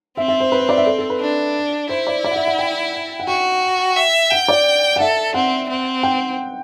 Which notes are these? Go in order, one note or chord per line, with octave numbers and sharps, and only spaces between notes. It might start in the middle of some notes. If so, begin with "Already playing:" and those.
C4 E5
E5
C5
B4
C5
D5
E5
A4
A4
B4
D4
E4 C5
D5
D5
F#5
E5
F#5
G5
F#5
F#4 G5
E5
F#5 G5
D5
F#5
A4 E5
C4 F#5
C4
G5